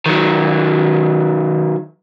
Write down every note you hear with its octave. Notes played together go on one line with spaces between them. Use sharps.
D#3 F#3